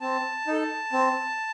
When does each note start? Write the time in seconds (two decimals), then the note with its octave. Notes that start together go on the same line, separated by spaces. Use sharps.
0.01 C4 A5
0.47 D#4 A4
0.93 C4